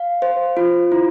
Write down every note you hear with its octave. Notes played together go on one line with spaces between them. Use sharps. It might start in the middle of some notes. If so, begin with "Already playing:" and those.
Already playing: F5
C5
F4
E4